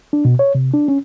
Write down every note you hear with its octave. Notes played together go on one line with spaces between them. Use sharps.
D4
B2
C#5
C3
D4
C#4